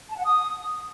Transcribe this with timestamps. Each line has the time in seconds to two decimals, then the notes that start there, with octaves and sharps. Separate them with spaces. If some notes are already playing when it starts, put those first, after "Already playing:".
0.07 A5
0.15 F#5
0.24 D#6